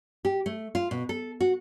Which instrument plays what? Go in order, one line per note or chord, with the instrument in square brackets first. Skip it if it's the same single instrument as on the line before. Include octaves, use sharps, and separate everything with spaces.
[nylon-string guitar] G4
A3
F4
B2
A4
F#4